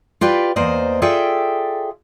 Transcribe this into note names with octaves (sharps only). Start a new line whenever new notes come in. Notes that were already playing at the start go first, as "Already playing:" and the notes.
F4 G4 B4 D5
E2 A#3 C5 D5 D#5
F4 G#4 A4 D5 E5 G5